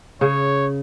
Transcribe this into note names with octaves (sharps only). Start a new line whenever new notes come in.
C#3 C#5